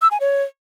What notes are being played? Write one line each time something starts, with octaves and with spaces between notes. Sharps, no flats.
E6
G#5
C#5